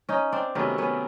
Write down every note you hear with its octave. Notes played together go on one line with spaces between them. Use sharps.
C#4 D#4
C4 D4
C3 D#3 F#3 A3 B3 C#4
B3 C#4